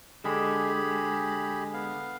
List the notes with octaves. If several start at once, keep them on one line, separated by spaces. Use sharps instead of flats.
D3 G#3 G4 G#4 B5
B3 F5